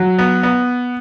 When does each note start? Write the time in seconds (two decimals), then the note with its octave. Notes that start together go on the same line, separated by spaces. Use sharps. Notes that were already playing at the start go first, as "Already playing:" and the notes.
Already playing: F#3
0.18 B3
0.43 B3